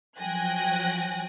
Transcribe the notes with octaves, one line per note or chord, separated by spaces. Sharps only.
F3 F#3 G5 G#5 F#6 A#6